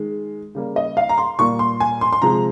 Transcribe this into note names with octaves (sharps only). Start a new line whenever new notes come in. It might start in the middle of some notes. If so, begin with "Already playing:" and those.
Already playing: D#3 G#3
C#3 G3 A#3
D#5
F5
A#5
C6
A#2 G3 A#3 C#6
C6
G#5
C6
C6
C3 F3 G#3 A#5